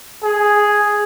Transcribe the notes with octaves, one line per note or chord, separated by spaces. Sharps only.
G#4